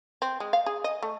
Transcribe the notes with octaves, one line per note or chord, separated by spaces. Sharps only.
C4
G#3
F5
G#4
D#5
A3